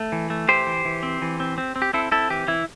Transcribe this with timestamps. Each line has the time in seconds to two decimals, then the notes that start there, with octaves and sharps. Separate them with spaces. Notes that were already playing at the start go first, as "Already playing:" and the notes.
Already playing: A3
0.12 E3
0.30 A3
0.48 E3 G4 C5
0.66 E3
0.85 E3
1.03 C4
1.22 E3
1.40 C4
1.58 C4
1.76 C4
1.82 G4
1.93 C4 E4 A4
2.12 C4 E4 A4
2.30 E3 G4
2.48 E3 E4